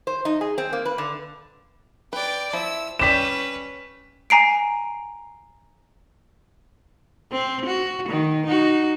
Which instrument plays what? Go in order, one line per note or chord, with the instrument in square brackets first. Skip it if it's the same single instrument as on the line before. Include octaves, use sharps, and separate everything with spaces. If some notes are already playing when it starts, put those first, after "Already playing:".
[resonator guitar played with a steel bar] C5
D#4
G#4
C4
A#3
B4
D3
[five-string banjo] B4 [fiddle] D5 G5
[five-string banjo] F3 E4 E5 [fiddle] E6
[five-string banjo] G3 G4 D5 [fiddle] C#4 B4 [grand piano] B6 E7
[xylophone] G#5 A#5 C7 D7
[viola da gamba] C4
F#4
D#3
D#4 F#4